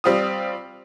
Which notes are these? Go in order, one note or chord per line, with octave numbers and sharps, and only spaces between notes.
G3 C4 F4 D#6